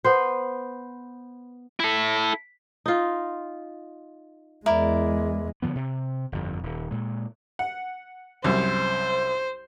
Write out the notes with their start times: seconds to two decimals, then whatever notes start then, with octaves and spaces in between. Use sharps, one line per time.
0.04 B3 B4 C5
1.80 E4 A4
2.86 D#4 F4
4.66 E2 G#3 E4 A#4 D5
5.62 D3 D#3 F3 B3
5.76 C3
6.32 G1 F2
6.63 D#1
6.91 A#2 G#3
7.59 F#5
8.44 C2 F#2 C5